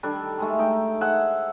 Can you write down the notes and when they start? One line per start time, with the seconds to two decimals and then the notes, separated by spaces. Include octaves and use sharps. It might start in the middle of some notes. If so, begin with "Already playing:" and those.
0.03 D#3 G3 D4 A4
0.38 D#3 G#3 A3
0.59 D#4 G5
1.01 G#4 C5 E5 F#5